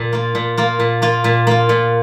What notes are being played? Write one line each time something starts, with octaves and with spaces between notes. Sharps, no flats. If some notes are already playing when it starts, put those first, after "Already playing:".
Already playing: A#2
A#3 F4
A#2
A#3 F4
A#2
A#3 F4
A#2
A#3 F4
A#2